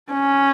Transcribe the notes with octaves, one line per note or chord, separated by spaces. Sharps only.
C#4